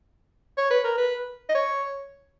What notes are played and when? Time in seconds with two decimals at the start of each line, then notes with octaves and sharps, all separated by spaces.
0.57 C#5
0.71 B4
0.84 A#4
0.98 B4
1.49 D#5
1.55 C#5